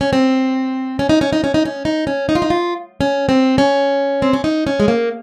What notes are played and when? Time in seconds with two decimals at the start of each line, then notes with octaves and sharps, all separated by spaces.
0.01 C#4
0.13 C4
0.99 C#4
1.09 D#4
1.21 C#4
1.33 D#4
1.44 C#4
1.54 D#4
1.65 C#4
1.85 D#4
2.07 C#4
2.29 D#4
2.35 F4
2.42 D#4
2.50 F4
3.01 C#4
3.29 C4
3.58 C#4
4.22 C4
4.33 C#4
4.44 D#4
4.67 C#4
4.80 G#3
4.88 A#3